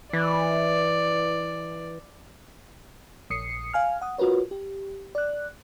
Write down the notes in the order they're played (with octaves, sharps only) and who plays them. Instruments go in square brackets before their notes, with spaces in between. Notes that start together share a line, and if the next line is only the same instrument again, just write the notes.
[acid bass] E3 [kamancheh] D5
[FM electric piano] A#1 D#6 C7 C#7
F5 G#5 F6
F#5 D#6
F4 F#4 A#4 B4 C#5
G4
D5 F#6